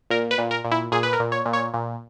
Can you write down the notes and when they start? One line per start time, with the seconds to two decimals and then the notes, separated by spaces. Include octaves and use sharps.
0.10 A#2 A#4
0.31 B4
0.38 A#2
0.51 A#4
0.65 A#2
0.71 E4
0.92 A#2 G#4
1.03 B4
1.13 A#4
1.20 A#2
1.32 C#5
1.45 A#2
1.53 C#5
1.74 A#2